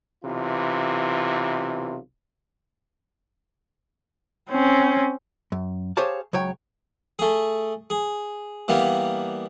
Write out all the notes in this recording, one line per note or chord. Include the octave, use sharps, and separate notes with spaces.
B1 C3 E3 F4
C4 C#4
F#2
G4 G#4 C5 C#5 F5 A5
C#2 F#3 C#5 G5
A3 G#4
G#4
E3 G3 A#3 B3